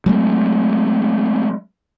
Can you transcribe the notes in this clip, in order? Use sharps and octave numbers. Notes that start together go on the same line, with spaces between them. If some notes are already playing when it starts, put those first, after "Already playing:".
F#3 G#3 A3 C4